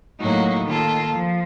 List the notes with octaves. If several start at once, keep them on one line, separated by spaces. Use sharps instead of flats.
A2 F#3 A#3 D#4 F#4
D#3 A#3 F4 A4
F3